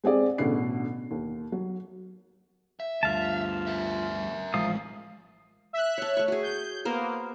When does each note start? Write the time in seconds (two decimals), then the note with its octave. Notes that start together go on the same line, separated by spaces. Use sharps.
0.04 G#3 C4 G#4 D5
0.38 A1 B2 D3 C7
1.11 D#2
1.52 F#3
2.80 E5
3.03 D2 G2 F4 F5 A5
3.67 A#4 E5
4.54 A1 F3 G#3 F5 D#6
5.73 E5 F#6
5.98 C#5 A5
6.17 A3 C#6
6.28 F#4 G#4
6.43 G6
6.85 A#3 B3 A#4 C5